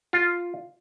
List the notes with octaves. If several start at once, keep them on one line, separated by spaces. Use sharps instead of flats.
F4